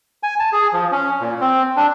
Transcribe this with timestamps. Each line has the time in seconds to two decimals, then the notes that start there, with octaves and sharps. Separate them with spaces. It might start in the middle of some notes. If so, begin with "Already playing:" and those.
0.23 G#5
0.40 A5
0.53 G#4
0.73 F3
0.92 C#4
1.21 A#2
1.41 C4
1.77 D4